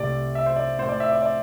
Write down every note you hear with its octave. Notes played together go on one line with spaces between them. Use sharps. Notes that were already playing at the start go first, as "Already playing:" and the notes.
Already playing: C2 C3 A3 D5
E5
C5
D5
A2 A3 C5
D5
E5
D5
D5